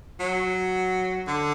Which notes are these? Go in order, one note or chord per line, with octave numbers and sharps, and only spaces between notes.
F#3
D3